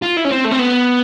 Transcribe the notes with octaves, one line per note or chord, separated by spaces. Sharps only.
F4
E4
C#4
C4
A3
C4
B3